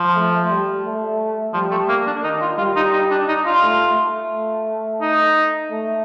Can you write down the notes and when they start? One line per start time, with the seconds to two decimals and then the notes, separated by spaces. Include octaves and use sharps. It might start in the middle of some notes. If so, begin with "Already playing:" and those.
Already playing: F3
0.15 A3
0.50 G3
0.85 A3
1.54 F3 G3
1.71 A3
1.89 A#3
2.07 D4
2.23 D#3 D#4
2.41 F4
2.58 G3 F4
2.76 D#4
2.93 D#4
3.11 D4
3.28 D#4
3.46 F4
3.63 A3
3.97 A3
5.01 D#4
5.71 A3